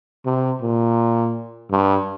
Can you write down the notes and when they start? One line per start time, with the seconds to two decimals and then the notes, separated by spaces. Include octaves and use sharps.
0.26 C3
0.61 A#2
1.71 G2